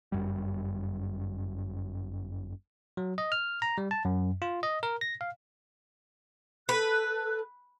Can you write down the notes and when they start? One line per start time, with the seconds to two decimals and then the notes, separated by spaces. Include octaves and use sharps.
0.12 G1 F#2 G3
2.97 F#3
3.18 D#5
3.32 F6
3.62 A#5
3.78 G3
3.91 A5
4.05 F#2
4.42 F4
4.63 D#5
4.83 A#4
5.01 A#6
5.21 F5
6.69 A4 B4 F#6